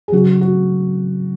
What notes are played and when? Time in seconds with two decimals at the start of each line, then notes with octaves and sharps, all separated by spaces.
0.08 G#4
0.12 C#3 F#3 C#4 F#4
0.41 F#4